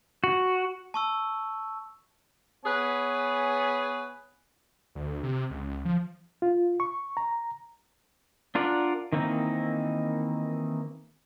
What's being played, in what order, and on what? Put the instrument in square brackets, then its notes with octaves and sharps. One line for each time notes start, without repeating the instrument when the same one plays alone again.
[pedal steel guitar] F#4
[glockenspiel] A5 C#6 E6
[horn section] B3 G#4 B4 C#5 G#5
[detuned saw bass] D2
C3
C#2
F3
[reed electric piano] F4
C#6
A#5
[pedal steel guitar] D4 F4 A#4 D5 F#5
D#3 E3 A#3 C4 D#4